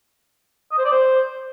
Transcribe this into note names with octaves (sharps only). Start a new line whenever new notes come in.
D#5
C5
D5
C5